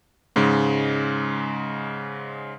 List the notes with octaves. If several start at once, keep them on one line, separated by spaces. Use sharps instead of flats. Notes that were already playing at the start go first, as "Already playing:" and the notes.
G#2 C#3 G#3